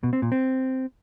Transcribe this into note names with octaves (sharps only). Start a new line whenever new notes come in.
B2
C4
A#2
C4